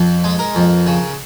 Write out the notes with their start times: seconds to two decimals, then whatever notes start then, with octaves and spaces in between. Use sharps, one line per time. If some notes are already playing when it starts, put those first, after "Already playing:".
Already playing: F2
0.24 G#3
0.39 A#4
0.55 F2
0.87 C#3